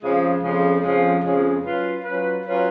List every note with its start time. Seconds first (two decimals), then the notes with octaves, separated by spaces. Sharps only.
0.03 F2 C#3 F3 G#3 C#4
0.43 F2 C#3 F3 G#3 C#4
0.83 F2 C#3 F3 G#3 C#4
1.23 F2 C#3 F3 G#3 C#4
1.63 F#3 C#4 F4 B4
2.04 F#3 C#4 F4 B4
2.45 F#3 C#4 F4 B4